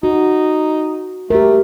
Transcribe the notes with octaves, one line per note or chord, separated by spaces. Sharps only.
D#4 F#4
A3 G4 A#4